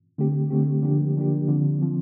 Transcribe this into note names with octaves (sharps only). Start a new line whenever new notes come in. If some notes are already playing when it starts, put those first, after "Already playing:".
D3 A3 C4 G4
D3 A3 C4 G4
D3 F3 A#3 D4 G4
D3 F3 A#3 D4 G4
D3 F3 C4
D3 F3 C4